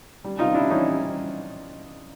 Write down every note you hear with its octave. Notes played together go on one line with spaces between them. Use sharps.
G3
C3 D#4 F4
G3 D4 E4
E3 C#4 D#4
G3